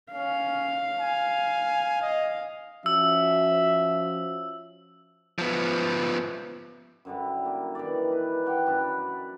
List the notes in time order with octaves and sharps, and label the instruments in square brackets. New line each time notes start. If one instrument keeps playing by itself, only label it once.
[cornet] C#4 [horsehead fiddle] F5
[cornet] G#5
D#5
[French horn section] F3 C#4 F#4 [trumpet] E5 [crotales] E6
[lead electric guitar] F3 B3
[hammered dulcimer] F#2 D3 G3 E4
A#3
D#3 E3 D5
B4
G4 F#5 G5
F#2 D4 B5